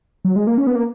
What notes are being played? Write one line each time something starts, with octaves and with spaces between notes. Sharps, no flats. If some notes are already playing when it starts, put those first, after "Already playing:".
F#3
G#3
A#3
C#4
B3
A#3